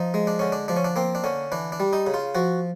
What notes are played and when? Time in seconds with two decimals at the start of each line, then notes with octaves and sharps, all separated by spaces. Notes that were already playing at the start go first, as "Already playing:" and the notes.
Already playing: F3 D#4
0.14 G#3
0.27 D4
0.39 D3 C#4
0.52 D4
0.68 F3 D4
0.77 C#4
0.85 D4
0.96 A#3 C4
1.15 D4
1.24 D3 C#4
1.52 E3 D4
1.72 D4
1.80 G3
1.93 D#4
2.07 C#3
2.14 F4
2.35 F3 F#4